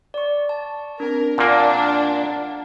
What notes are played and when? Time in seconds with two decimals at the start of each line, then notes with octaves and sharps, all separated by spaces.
0.14 D5 C#6
0.49 A5
1.00 C4 D4 A#4
1.38 A#2 A#3 D4 F#5